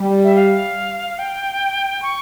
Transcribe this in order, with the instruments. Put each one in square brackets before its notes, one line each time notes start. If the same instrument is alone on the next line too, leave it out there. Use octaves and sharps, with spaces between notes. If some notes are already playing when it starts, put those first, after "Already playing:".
Already playing: [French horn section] G3
[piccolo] E5
F5
G5
C#6